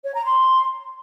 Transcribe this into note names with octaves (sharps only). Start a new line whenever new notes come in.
C#5
A#5
C6